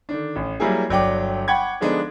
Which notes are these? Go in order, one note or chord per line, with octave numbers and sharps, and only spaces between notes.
D3 D#3 D4
A1
F#3 G3 A#3 E4 G#4
G1 F#3 D5 G5 D6
F#5 G5 B5 C#6 G#6
D3 F3 G#3 B3 D4 D#4